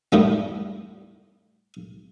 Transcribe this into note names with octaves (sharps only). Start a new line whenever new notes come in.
A2 G3 B3